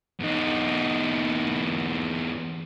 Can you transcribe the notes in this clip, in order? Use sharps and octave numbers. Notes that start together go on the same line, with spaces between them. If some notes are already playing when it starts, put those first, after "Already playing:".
E2 D#4